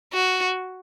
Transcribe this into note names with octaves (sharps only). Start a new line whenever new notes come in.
F#4